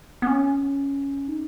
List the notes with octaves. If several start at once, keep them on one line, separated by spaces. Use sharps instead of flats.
B3
C#4
D#4